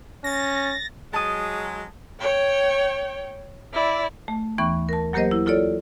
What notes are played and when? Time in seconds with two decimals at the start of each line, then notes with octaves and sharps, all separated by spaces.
0.24 C#4 A6 A#6
1.13 F#3 G#3 A5 D#6
2.20 C#5 G5
3.73 E4 D5
4.28 A3
4.58 D#2 E3 B3 C#6
4.89 A#4 A5
5.13 F#3 A#3 G4 A#4 C5 D#5
5.31 E4
5.46 E4 F4 A4 C#5 D5